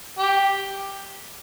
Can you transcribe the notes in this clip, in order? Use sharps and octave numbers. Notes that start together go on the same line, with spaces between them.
G4